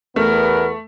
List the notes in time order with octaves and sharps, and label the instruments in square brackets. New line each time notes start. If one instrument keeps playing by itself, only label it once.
[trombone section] E2 B3 [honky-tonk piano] A3 [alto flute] A#4